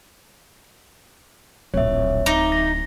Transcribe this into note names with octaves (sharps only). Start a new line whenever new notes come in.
D1 A#1 C#5 E5
D1 D#4 E5 D6
A#6